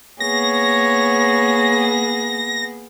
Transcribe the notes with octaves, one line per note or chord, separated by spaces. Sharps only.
A#3 B3 G#4 C#5 A#6